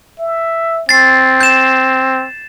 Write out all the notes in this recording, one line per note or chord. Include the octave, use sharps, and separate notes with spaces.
E5
C4 A6 C7
G6 E7